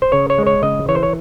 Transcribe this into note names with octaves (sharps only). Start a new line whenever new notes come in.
C5
C#3 C#5
C#5
G#3
C#5
C#3 D#5
E3 C#5
C5
C#5